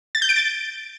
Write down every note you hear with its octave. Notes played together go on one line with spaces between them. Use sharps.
A6
G6
D7
A6